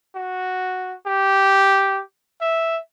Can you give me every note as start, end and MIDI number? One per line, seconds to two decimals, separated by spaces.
0.15 0.95 66
1.07 2.02 67
2.41 2.78 76